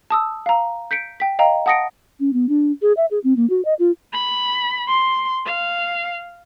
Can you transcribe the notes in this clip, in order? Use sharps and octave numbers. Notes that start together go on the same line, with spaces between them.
A5 D#6 E6
F5 A#5
G6 B6 C#7 D7
G5 B6
D#5 F5 G5 A#5
F#5 A5 D#6 A#6 C#7 D7
C#4
B3
D4
G#4
E5
G#4
C4
A#3
F#4
D#5
F4
B5
C6
F5